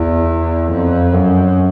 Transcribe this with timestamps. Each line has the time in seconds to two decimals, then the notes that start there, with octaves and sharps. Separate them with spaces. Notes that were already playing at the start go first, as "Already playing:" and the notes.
Already playing: E2
0.71 F2
1.12 F#2